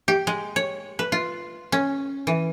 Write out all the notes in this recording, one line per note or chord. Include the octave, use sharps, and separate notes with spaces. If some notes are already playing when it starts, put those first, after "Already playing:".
G4
G#3
C#5
B4
F4
C#4
E3